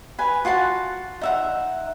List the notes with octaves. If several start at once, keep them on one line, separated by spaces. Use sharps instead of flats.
B4 G#5
F4 F#4 F#5 A5
D#4 E5 F#5